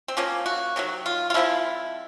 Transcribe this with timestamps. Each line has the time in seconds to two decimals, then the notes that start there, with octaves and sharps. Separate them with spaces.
0.08 C4
0.17 F3 A#3 C#4
0.46 F#4
0.76 C3 D#3 F#3
1.06 F4
1.30 F4
1.34 F3 G#3 C4 E4